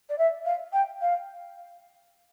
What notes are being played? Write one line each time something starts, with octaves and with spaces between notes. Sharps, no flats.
D5
E5
F5
G5
F5